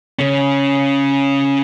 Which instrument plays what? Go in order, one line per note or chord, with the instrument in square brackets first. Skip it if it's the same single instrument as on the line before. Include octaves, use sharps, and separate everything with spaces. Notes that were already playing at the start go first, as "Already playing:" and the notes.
[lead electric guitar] C#3 C#4